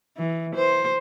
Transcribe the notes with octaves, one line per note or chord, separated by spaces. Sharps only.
E3
C5